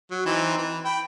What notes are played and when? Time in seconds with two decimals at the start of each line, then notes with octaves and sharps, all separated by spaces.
0.11 F#3
0.26 E3 C4 D#4
0.57 E3
0.85 G5 B5